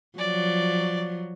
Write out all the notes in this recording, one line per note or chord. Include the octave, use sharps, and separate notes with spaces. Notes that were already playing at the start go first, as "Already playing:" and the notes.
F3 F#3 D5